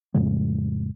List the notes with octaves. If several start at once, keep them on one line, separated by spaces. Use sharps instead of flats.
F2 A2 C#3 G#3